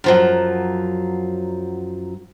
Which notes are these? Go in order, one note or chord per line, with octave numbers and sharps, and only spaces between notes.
F#2 F3 F#3